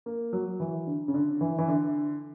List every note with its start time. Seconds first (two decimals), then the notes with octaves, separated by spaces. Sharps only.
0.06 A#3
0.33 F#3
0.60 E3
0.87 D3
1.08 C#3
1.14 D3
1.41 E3
1.58 E3
1.68 D3